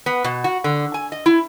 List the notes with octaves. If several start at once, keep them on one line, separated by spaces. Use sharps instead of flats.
B3
B2
F#4
D3
G#5
D#5
E4